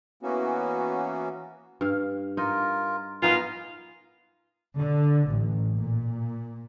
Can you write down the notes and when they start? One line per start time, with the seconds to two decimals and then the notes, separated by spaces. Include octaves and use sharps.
0.23 E3 A#3 B3 C#4 F#4
1.81 G2 F5
2.37 D#4 F4 A#4
3.22 B3 D#4 F4 A#4 D#5 G#5
4.78 D3
5.28 A1
5.79 A#2